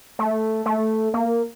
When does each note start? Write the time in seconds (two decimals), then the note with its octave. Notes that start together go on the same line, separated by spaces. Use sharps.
0.19 A3
0.66 A3
1.14 A#3